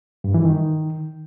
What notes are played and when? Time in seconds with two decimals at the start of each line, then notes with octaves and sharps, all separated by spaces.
0.24 G2
0.34 E3
0.45 D#3